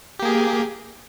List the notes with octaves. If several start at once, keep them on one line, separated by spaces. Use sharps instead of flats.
A#3 G4 G#4